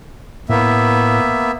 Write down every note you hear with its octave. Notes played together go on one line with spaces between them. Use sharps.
A2 A#3 B3 E5